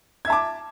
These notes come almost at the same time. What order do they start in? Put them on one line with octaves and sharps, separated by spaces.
G#6 E5 A5 D6